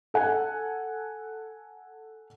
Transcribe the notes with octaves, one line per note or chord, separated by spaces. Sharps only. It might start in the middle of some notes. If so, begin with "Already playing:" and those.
A4 F#5 G#5